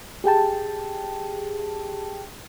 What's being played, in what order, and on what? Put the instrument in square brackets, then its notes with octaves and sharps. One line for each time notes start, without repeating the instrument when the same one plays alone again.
[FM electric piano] G4 G#4 G5 A5